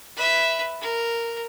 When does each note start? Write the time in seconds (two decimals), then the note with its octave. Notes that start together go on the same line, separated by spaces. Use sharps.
0.16 B4 E5
0.81 A#4